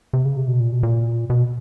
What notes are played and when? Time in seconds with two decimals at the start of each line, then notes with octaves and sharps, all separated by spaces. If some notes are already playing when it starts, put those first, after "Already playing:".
0.13 C3
0.25 C#3
0.37 C3
0.48 B2
0.60 A#2
0.72 B2
0.83 A#2
1.30 B2